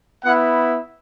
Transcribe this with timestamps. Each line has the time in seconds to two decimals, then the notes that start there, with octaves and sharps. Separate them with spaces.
0.24 B3 E4 F#5